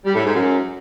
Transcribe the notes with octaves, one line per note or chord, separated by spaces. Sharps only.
G3
A2
G#2
F#2